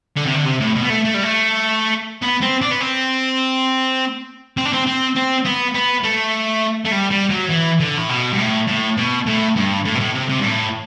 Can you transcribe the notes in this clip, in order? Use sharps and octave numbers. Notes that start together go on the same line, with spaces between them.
D3
C3
D3
C3
A2
B2
B3
A3
A3
G3
A3
B3
C4
D4
B3
C4
C4
D4
C4
C4
C4
B3
B3
A3
A3
G3
G3
F#3
E3
D3
A2
B2
G2
A2
A2
B2
A2
G2
A2
B2
A2
C3
C3
G2
A2